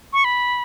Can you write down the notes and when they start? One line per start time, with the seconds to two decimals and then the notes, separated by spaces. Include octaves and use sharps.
0.13 C#6
0.24 B5